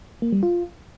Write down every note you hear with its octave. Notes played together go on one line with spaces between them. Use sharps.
A#3
G3
F4